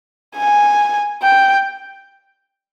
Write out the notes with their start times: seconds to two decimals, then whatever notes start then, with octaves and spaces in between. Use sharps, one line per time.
0.37 G#5
1.23 G5